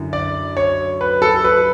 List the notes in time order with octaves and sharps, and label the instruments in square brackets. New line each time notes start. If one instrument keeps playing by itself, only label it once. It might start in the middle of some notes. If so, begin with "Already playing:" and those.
Already playing: [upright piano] F#2 D3 E4
[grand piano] D5
C#5
B4
A4
B4